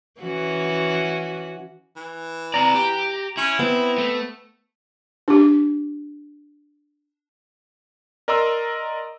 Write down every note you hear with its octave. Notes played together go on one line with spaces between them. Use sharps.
E3 C#4 F#4
E3
C4 D5 A#5
G4
C#4 E4
B3 C4
A3
D4 G4
A#4 D5 D#5 A#5 C6 E6